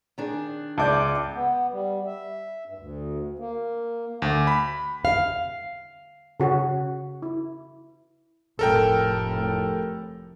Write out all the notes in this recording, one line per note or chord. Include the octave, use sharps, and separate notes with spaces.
D#3 D4 G#4
C#2 D5 E5 A5 D6 G6
B3
G3
E5
G2
D2
A#3
D2
B5
F5
C#3 F#4 C#5
E4
F1 A2 A4 A#4 G5